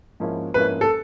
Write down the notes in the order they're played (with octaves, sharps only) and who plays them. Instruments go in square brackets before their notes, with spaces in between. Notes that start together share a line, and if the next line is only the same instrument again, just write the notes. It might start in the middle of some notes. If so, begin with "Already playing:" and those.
[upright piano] G#2 F3 A#3 C#4 E4
[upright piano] G#2 F3 A#3 C#4 E4 [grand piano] B4
[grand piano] A4